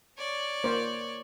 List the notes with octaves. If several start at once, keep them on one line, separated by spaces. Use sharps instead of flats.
C#5 D5
A#3 C5